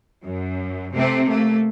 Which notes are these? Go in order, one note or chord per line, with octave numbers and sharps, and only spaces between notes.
F#2
C3 A3 C4
A3 A#3